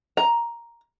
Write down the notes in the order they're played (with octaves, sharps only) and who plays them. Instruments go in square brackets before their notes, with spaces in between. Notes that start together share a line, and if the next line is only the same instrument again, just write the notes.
[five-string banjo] A#5